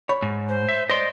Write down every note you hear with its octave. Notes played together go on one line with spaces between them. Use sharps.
C#5 B5
G#2
C5
E5
C5 D5 D#5 C6